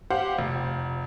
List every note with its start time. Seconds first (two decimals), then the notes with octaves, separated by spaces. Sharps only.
0.10 G4 C5 F5 F#5
0.39 F1